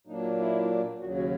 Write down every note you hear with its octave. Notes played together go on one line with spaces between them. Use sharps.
A#2 F#3 A#3 D4 D#4
D#4
E4
D#2 C#3 F#3 F#4
F#4